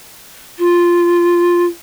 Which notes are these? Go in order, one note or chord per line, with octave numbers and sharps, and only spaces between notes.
F4